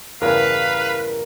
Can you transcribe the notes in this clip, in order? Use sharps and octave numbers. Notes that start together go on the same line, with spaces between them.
E2 G2 C#3 A#4 B4 F5